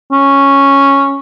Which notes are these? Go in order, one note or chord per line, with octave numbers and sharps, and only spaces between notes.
C#4